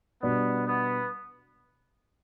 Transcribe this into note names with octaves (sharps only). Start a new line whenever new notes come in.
B2 G3 B3 D4
B3